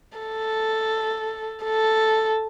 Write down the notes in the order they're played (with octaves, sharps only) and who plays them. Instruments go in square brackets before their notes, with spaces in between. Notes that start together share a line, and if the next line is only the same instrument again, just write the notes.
[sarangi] A4
A4